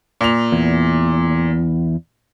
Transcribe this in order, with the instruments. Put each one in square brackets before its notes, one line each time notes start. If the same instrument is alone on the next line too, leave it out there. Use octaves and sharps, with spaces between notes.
[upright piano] A#2 F7
[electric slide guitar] E2